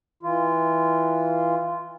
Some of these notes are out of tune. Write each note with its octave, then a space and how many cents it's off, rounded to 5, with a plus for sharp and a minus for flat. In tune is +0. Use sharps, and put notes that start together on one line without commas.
E3 -15 F4 -15